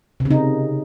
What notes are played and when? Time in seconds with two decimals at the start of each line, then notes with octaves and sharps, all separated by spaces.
0.20 C3
0.25 C#3
0.31 D#4